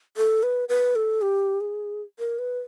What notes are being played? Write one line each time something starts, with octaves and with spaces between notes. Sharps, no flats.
A4
B4
B4
A4
G4
G#4
A#4
B4